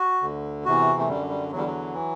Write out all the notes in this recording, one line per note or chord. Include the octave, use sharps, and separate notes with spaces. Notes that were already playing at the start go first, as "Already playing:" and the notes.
Already playing: F#4
D2 D3
E2 C3 E3 F#4
A3
F#2 D3 G3
G3
E2 D3 F#3 G3
F#3
E3